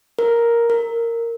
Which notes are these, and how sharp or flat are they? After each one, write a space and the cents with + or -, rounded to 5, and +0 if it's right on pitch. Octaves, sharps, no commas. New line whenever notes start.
A#4 +5
A#4 -10